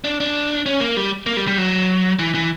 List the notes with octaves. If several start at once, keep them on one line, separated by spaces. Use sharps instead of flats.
D4
D4
C#4
A#3
G3
A#3
G3
G3
F#3
E3
E3